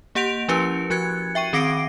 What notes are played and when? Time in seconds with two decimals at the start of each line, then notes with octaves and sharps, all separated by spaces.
0.15 A#3 G4 F#5 G6 D7 F7
0.48 F3 C#4 E4 G4 B4 C#7
0.90 F3 F#4 F#6 G#6 C#7
1.35 E5 G5 C#6 D#7
1.53 D#3 C4 D6 A#6 C7 D7